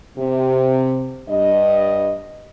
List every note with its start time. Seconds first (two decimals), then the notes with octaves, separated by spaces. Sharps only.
0.17 C3
1.29 G2 D#5